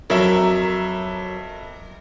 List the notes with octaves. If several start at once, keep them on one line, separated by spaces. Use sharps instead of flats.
F2 F#3 A#4 E5